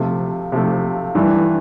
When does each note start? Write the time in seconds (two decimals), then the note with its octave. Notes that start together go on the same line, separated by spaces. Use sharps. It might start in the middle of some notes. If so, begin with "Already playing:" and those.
Already playing: C3 F3 A3
0.52 C3 F3 A3
1.15 G2 E3 A3